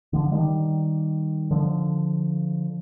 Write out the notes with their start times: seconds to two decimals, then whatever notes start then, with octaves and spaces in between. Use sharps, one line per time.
0.13 D3 F3
0.32 D#3 G3
1.51 D3 F3